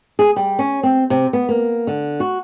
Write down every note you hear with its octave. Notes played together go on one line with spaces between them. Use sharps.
G#4
G3
C#4
C4
C3
B3
A#3
D3
F#4